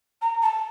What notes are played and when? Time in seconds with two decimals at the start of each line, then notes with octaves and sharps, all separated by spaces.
0.22 A#5
0.42 A5